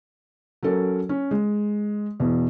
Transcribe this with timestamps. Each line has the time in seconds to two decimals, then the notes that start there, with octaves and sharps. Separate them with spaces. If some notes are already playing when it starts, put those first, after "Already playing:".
0.63 F#3 C#4 A4 A#4
1.09 C#4
1.31 G#3
2.20 E2 B2